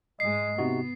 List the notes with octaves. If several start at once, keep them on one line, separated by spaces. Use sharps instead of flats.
G#2 G#3 D#5 C7
C3 B3 D#4 F#4